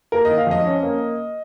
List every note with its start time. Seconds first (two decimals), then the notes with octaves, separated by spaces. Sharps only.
0.12 A#3 A#4
0.25 D#3 D#5
0.38 F5
0.47 F2 D#5
0.65 C#4
0.83 A#3